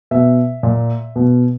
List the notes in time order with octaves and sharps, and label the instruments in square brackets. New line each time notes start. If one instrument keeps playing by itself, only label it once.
[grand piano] B2 E5
A#2
B2